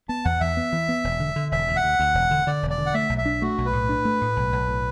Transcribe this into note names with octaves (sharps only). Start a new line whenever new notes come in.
B3 A5
E2 F#5
E2 E5
B3
E3
B3
E1
D3
D3
E1 E5
D2
F#5
D2
D2
E1
D3
D3 D5
E1
D5
D3
F#5
A3 E5
B1
E5
D4
A3 F#4
B1
B4
A2
D4
A3
A2
B1
B1
A2